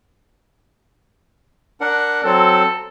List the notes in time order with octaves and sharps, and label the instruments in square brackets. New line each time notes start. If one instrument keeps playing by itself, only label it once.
[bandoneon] D4 A#4 F#5
[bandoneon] F#3 C4 [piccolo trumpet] A4